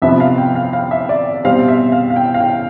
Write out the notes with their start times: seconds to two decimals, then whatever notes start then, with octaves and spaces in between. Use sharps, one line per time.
0.02 F2 C3 F3 B3 E5
0.20 F5
0.38 G5
0.55 F5
0.73 F5
0.91 E5
1.09 D5
1.44 B2 G3 C4 F5
1.68 E5
1.92 F5
2.10 F5
2.16 G5
2.34 F5
2.40 G5